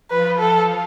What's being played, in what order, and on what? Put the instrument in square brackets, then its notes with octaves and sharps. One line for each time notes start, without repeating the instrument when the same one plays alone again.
[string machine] F3 F4 [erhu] B4
[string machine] F3 F4 [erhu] A4